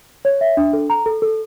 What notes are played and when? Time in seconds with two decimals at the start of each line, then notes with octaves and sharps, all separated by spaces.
0.25 C#5
0.41 E5
0.57 D4
0.73 A4
0.90 A#5
1.06 A4
1.22 A4